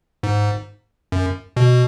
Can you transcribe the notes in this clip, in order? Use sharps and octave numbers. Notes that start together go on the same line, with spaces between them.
G#2
F#2
B2